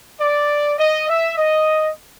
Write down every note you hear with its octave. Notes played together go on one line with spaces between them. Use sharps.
D5
D#5
E5
D#5